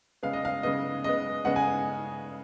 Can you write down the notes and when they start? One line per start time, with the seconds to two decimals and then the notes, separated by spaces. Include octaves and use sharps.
0.23 C#3 G#3 B3 F5
0.33 D#5
0.45 F5
0.63 C#3 G#3 B3 D#5
1.04 C#3 G#3 B3 D#5
1.45 C#3 G#3 B3 F#5
1.56 G#5